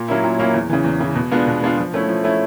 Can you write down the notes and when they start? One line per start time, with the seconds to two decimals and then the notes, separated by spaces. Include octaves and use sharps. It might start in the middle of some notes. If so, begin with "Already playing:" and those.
Already playing: A#2
0.08 F#3 A#3 C#4 E4
0.24 A#2
0.38 F#3 A#3 C#4 E4
0.54 E2
0.69 C#3 E3
0.84 E2
1.00 C#3 E3
1.15 B2
1.31 G#3 B3 D4 F4
1.47 B2
1.62 G#3 B3 D4 F4
1.77 F3
1.94 A3 C#4 E4
2.09 F3
2.24 A3 C#4 E4